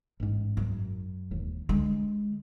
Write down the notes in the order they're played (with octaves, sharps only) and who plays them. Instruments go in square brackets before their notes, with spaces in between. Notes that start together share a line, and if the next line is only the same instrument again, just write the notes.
[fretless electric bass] A1 G#2
[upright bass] F#2
[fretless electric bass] E1 D#2
[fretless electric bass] D3 [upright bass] G#3